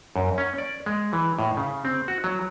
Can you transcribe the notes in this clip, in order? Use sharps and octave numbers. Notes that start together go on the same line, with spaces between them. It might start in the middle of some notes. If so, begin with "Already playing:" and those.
F#2
C#4
D5
G#3
E3
A2
C#3
C4
F#4
F#3